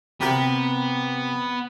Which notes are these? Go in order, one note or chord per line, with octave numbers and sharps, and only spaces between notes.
C3 B3 G4 A#4